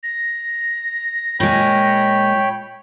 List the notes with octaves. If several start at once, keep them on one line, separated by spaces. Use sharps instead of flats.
A#6
A#2 G#3 C#5 G5 B5